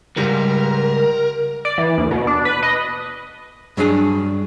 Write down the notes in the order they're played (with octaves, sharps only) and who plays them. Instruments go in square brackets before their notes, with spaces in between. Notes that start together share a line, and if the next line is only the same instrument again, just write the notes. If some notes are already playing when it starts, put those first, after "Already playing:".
[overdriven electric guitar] C#2 [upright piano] G#2 G3 [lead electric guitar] A#4
[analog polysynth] D5
E3
D#2
B2
D4
B4
D#5
[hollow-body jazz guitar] G2 F#3 D4 G#4 D5